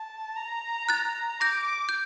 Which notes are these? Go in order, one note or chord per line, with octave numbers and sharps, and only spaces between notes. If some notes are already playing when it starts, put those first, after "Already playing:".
Already playing: A5
A#5
F#6 A6
D6 G6 A#6
G6